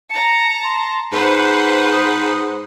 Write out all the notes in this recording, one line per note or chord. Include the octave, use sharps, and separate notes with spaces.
A5 A#5 C#7
C6
G#2 B4 C5 F#5 B5
D#6